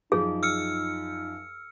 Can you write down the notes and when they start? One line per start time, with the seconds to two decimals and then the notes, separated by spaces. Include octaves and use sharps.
0.12 F#2 F3 D#4 G#4
0.43 E6 F6 C#7